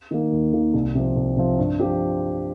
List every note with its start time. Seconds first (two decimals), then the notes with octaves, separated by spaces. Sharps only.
0.11 D#3 A#3
0.32 D#2
0.53 D#3 A#3
0.74 C2
0.95 C3 F3 C4
1.16 C2
1.37 C3 F3 C4
1.58 G2
1.80 F3 C4 G4